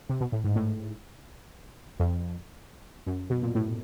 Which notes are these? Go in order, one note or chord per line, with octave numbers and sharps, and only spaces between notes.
C3
B2
A2
G#2
A2
F2
F#2
B2
A#2
A2